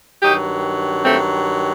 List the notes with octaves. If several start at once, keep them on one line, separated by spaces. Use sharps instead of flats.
G2 D#3 F#3 D#4 G4
A3 C4